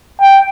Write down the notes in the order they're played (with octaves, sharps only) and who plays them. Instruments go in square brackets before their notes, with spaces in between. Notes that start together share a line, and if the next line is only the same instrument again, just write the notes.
[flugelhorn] G5